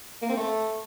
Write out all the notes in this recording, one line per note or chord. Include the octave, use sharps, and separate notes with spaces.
A#3
C4
A3